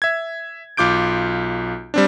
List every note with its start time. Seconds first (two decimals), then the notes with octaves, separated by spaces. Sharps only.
0.02 E5 G#6
0.77 B1 F4 D6 G6 D7
1.94 G3 C4 D4